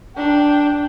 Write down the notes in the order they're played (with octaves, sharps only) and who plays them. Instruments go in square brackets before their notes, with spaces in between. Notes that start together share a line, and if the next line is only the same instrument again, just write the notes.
[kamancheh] D4 G5